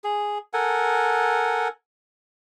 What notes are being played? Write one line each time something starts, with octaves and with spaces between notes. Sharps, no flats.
G#4
A4 A#4 F#5 G#5